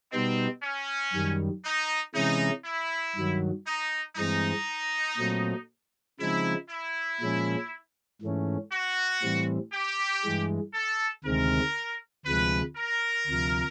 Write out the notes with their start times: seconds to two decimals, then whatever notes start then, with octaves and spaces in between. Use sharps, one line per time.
0.12 B2 G3 B3 C4 D#4
0.63 C#4
1.13 F#2 D#3 G3
1.65 D#4
2.15 C3 E3 G#3 C#4 D#4 E4
2.65 E4
3.16 G2 D#3 F#3
3.67 D#4
4.17 G2 E3 G#3 C4 D#4
5.18 A#2 F#3 A3 C4
6.20 C#3 F3 G#3 C4 D#4 E4
6.70 E4
7.21 A#2 F3 G#3 C#4
8.22 G#2 E3 A3 C#4
8.72 F#4
9.23 A2 E3 G3 C4
9.73 G4
10.24 G2 E3 G#3
10.74 A4
11.24 D2 C3 D#3 G#3 C4 A#4
12.25 D2 C3 F3 G#3 B4
12.77 A#4
13.27 D2 C3 F3